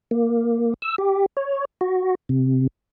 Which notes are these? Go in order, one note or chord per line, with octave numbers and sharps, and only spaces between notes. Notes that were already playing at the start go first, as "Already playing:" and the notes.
A#3
E6
G4
C#5
F#4
C3